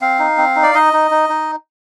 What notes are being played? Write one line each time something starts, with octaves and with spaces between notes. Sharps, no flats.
C4 F5
D#4
C4
D#4
D5
D#4 D#5
D#4
D#4
D#4